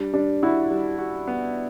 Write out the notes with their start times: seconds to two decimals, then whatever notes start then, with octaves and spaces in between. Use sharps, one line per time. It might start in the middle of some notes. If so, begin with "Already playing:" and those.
Already playing: G3 D4
0.14 G3 D4
0.43 E4 F#4
0.71 G3
0.98 F#4
1.28 B3